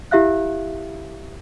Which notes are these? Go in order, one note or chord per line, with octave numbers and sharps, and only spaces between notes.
E4 G4 E5 F5 F#6